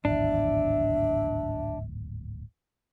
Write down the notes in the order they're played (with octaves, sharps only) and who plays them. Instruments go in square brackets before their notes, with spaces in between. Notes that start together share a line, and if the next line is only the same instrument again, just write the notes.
[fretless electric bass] D1 G#1 E2 [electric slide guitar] D4 [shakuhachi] E5